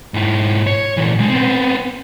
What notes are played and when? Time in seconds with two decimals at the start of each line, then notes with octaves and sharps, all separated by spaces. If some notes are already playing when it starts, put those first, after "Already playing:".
0.14 G#2 E4
0.67 C#5
0.97 A#2 E3
1.18 B1 G#3
1.30 B3 C4